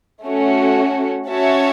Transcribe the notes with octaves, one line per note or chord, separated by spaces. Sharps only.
A3 C#4 F#4
C#4 F#4 C#5 E5 A5